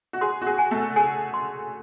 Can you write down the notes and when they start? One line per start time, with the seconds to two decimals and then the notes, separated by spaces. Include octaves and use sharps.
0.13 F#4
0.21 G#4 C6
0.42 F#4
0.47 G#4
0.58 G#5
0.71 A3 A4
0.96 G#4 G#5
1.34 C6